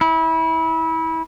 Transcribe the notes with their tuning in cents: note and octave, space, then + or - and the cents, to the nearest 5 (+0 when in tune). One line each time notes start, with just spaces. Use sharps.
E4 -25